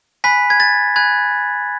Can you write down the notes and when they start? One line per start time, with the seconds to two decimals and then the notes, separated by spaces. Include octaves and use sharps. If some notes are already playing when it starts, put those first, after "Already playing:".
0.24 G#5 B5 F#6 B6
0.50 G#6
0.60 A6
0.96 G#5 B5 F#6 G#6